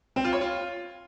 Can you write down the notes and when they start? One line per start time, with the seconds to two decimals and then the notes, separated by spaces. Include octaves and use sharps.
0.16 C4
0.24 F4
0.33 C#5
0.41 F4